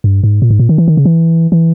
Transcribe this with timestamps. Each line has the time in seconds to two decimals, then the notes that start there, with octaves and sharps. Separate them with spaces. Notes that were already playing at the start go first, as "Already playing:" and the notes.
0.04 G2
0.23 G#2
0.42 A#2
0.50 G#2
0.60 A#2
0.69 D#3
0.78 E3
0.88 D#3
0.97 C#3
1.05 E3
1.52 E3